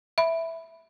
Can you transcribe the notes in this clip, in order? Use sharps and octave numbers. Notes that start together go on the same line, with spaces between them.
E5 B5